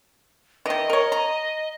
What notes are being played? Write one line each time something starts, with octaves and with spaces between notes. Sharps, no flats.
D#3 E3 D#5
A#4 C#5
A#5